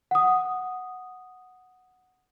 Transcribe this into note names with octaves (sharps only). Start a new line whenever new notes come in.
F#5 D#6